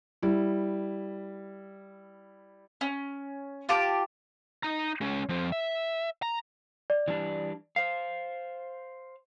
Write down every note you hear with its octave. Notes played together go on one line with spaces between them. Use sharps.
G3 E4
C#4
F4 G4 A5 D6
D#4 A#5
G#3 C#4
F3 C4
E5
A#5
D5
E3 G3 D4
C5 F5 C7